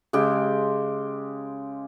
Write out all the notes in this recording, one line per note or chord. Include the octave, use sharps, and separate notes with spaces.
C#3 G#3 G4 G5